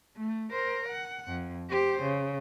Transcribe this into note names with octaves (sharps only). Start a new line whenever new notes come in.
A3
A#4 C5
F#5
F2
G4 C5
C#3